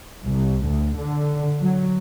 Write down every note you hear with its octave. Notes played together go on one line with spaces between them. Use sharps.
C2
D2
D3
F#3